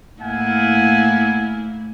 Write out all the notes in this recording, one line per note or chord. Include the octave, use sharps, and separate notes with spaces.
A2 A#3 E4 F5 F#5 G#5